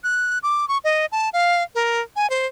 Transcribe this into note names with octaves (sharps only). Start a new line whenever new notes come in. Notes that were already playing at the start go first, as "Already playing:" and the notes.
F#6
D6
C#6
D#5
A5
F5
A#4
G#5
C5